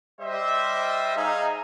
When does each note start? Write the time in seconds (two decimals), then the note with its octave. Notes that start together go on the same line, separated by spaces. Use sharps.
0.21 G3 C5 D#5 E5
1.16 D#4 G#4 F5